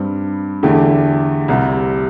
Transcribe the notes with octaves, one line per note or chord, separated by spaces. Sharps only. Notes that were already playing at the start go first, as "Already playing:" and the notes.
Already playing: G2 G3 C4
E2 D3 A3 E4 G4
C2 C3 G3